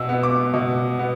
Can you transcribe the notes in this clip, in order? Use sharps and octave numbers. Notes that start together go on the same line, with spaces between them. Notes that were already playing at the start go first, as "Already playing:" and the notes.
Already playing: B2 E6
B3
D6
B2
B3